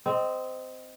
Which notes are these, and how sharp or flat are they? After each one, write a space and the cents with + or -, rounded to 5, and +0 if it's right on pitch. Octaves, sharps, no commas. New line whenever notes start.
C4 -15 D#5 +0